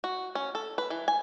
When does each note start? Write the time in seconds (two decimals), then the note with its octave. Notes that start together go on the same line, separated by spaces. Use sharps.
0.04 F#4
0.35 C#4
0.55 A4
0.78 B4
0.90 E3
1.08 G#5